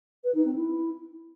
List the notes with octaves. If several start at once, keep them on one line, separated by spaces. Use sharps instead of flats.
B4
D#4
C4
E4